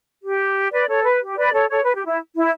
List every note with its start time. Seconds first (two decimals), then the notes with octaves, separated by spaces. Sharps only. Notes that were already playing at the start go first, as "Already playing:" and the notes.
0.22 G4
0.71 B4 D5
0.88 A4 C#5
1.04 B4
1.21 G4
1.37 B4 D5
1.53 A4 C#5
1.69 A4 C#5
1.82 B4
1.93 G4
2.06 E4
2.35 E4